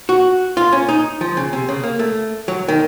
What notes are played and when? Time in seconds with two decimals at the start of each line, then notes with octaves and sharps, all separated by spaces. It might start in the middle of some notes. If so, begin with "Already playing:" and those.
0.09 F#4
0.57 F4
0.73 C#4
0.88 D#4
1.21 F3
1.37 C#3
1.53 C3
1.69 C#3
1.83 A#3
1.99 A3
2.48 F#3
2.68 D#3